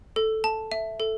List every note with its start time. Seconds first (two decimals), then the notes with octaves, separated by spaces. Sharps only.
0.16 A4
0.44 A5
0.72 E5
1.00 A4